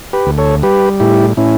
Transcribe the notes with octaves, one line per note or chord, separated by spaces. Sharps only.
G4 B4
D2
A4 C#5
G3 G4 B4
A2 E4 G4
A2 C#4 E4